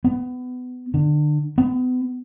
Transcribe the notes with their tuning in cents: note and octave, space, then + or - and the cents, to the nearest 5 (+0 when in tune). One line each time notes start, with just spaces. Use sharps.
B3 +25
D3 +30
B3 +35